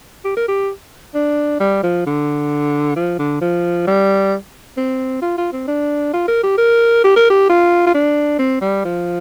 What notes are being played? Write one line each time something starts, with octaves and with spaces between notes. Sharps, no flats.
G4
A#4
G4
D4
G3
F3
D3
F3
D3
F3
G3
C4
F4
F4
C4
D4
F4
A#4
G4
A#4
G4
A#4
G4
F4
F4
D4
C4
G3
F3